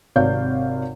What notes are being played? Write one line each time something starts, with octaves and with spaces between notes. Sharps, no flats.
G#1 C3 C#5 D5 F5 G6